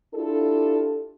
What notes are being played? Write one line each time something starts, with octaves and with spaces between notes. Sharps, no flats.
D4 E4 F4 G4 A4